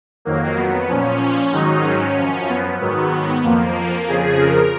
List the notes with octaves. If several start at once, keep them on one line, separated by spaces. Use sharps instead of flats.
F2 D#3 F#3 A#3
B3
A#2 F3 C#4
G#2 D#3 F#3 D#4
C#4
F#2 F3
B3
G#2 D#3 F#3 B3
F2 F3 A#3
F2 C#3 F3 G#4
A#4